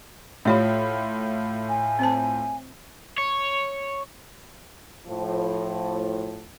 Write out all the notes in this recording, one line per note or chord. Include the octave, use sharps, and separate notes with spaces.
A2 F4 G4 C#5 D5 B5
G#5
C4 C5 A5
C#5
A2 F3